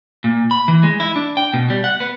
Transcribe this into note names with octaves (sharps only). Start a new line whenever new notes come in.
A#2
B5
E3
G#3
E4
D4
G5
B2
G3
F#5
B3